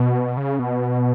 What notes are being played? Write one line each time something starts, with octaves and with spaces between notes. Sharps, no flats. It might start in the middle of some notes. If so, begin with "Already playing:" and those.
Already playing: B2
C#3
B2